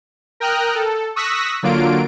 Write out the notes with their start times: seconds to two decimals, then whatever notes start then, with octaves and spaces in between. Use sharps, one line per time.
0.40 A#4 G5 A#5 D#6 F6 F#6
0.75 A4
1.16 C#6 D#6 E6 F#6 A#6 B6
1.63 D3 F#3 A#3 F4 D7